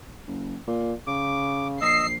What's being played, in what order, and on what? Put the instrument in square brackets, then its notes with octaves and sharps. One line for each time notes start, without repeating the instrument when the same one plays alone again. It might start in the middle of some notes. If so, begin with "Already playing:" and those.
[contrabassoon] F#1
A#2
[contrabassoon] C#3 [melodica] D6
[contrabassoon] A#1 [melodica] D#5 E6 [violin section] C7